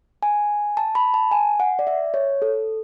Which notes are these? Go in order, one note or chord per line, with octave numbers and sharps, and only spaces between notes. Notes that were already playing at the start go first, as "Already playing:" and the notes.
G#5
A5
B5
A5
G#5
F#5
D5
E5
C#5
A4